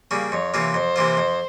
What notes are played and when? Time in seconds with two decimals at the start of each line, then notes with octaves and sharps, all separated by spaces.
0.11 C#3 G3 A#3 C#4
0.32 F2 C#5
0.54 C3 E3 A#3 F4
0.74 F2 C5
0.96 C3 E3 A#3 F4
1.17 F2